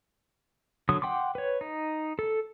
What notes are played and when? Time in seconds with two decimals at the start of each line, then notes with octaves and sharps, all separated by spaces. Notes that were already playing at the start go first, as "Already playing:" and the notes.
0.89 D3 F#3 D#6
1.02 F#5 G5 C6 D6
1.35 B4 C#5
1.61 D#4
2.19 A4